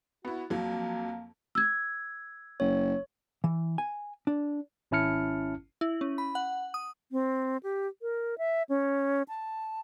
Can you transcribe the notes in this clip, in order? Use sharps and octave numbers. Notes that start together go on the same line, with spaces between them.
B3 E4 F#4
F2 F#3 A#3
E6 G#6
F#1 C#5
E3
G#5
D4
G#1 C#4 E4 A5 F6 C#7
E4
C#4
B5
F#5
D#6
C4
G4
A#4
E5
C#4
A5